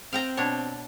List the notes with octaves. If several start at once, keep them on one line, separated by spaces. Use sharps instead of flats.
C4 F5 G5 A#5
B2 D4 C#5